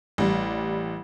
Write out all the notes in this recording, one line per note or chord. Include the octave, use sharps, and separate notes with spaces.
A1 G3